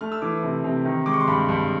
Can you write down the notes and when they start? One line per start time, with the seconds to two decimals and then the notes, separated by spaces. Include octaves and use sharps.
0.01 A3 F6
0.12 E6
0.22 E3 D6
0.43 C3
0.64 C3
0.85 D#3
1.06 G#3 D6
1.13 C#6
1.20 C6
1.27 G2 B5
1.49 G2